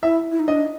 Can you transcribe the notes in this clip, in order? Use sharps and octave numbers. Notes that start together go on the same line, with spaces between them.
E4 E5
E4
D#4
D4 D#5